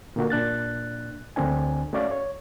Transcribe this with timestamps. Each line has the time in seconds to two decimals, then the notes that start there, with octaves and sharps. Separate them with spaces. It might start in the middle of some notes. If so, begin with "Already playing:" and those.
0.16 A#2 D3 A#3 F#4
0.30 A#2 D4 F#6 A6
1.36 D2 D3 C4 D4 G#5
1.93 A3 C#4 F#4 C#5 D5 F5
2.11 C#5